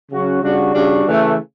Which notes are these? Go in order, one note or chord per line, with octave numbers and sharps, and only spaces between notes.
C#3 F#3 C#4 F#4
C#3 G3 D4 F#4
C#3 G3 D4 F#4
C#3 E3 A3